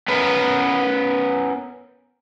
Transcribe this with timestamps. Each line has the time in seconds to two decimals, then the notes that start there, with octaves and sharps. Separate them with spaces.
0.08 B3 C#4 A#4 B4